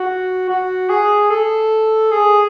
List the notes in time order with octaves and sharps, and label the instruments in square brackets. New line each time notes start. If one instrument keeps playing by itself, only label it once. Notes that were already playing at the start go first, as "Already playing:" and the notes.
Already playing: [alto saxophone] F#4
F#4
G#4
A4
G#4